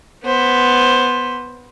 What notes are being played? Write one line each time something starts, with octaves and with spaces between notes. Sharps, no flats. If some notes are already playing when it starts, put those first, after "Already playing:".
B3 C5